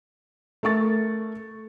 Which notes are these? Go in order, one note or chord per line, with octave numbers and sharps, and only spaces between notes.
A3 A#4 C#6 A6